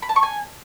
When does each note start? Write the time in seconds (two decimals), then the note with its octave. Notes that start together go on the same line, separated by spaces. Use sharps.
0.02 B5
0.09 A5
0.16 C#6
0.23 G#5